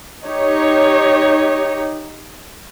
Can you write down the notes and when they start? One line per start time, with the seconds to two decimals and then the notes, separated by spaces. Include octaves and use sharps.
0.26 D#4 G4 C#5